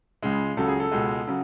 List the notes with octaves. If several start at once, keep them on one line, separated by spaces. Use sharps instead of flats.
C#2 C#3 G#3
C#2 C#3 F#3 A4
G#4
A4
C#2 B2 G#3
C#3 F#3